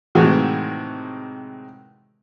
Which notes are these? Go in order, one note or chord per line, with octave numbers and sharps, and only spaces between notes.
A2 C3 D#3 E3 G#3 F#4